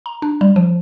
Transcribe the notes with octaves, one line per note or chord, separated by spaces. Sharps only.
A#5
D4
G3
F3